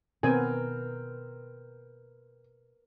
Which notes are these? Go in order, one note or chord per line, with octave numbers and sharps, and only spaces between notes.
B2 D#3 B3 C4 A#4 B4 G#5